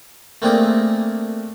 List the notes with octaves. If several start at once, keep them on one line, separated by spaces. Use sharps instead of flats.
A3 A#3 C4 D4 G#4 A#4